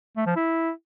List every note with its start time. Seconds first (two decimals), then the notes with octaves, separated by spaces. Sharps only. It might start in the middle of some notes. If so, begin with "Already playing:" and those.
0.17 A3
0.26 F3
0.36 E4